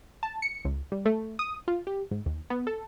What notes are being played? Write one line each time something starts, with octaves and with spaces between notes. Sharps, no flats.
A5
C#7
C#2
G3
A3
D#6
F4
G4
G#2
D#2
B3
A4